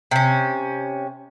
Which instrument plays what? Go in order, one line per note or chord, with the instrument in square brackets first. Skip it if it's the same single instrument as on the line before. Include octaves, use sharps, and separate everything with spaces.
[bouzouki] C3 C#4